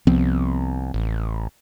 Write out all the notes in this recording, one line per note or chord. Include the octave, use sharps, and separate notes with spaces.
C2 F3 B3 C4
A1